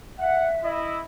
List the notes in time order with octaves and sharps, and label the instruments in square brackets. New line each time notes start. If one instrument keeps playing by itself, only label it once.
[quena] E5 [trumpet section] F#5
[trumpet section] E4 D#5